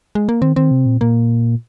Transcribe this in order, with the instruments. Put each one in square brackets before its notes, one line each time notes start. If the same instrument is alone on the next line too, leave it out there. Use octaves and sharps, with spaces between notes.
[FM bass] G#3
A#3
[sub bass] D#3 [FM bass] C4
[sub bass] D#3 [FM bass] C4
[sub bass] C3
A#2
[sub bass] A#2 [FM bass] A#3